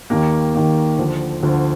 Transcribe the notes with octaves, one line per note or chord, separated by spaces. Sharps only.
D#2 D#3 A#3
D#2 D#3 A#3
D2 D3 F3
D2 D3 F3